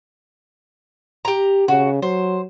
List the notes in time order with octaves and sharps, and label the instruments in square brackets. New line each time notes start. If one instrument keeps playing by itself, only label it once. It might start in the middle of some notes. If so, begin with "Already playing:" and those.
[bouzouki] G4 A#5
[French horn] C#3 [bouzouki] F#4
[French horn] F#3 [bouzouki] C5